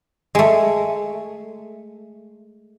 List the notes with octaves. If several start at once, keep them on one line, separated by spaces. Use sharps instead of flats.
G#3 A3